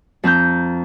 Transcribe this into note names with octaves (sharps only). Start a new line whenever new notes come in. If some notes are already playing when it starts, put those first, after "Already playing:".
F2 C4 A#5 G6